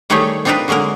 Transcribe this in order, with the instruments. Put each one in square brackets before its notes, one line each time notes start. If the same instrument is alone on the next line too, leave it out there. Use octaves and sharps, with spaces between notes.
[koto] D#3 G3 A3 G4 G#4 C#5
C4 D4 D#4 F4 A#4 B4
D3 F#3 G#3 A#3 A#4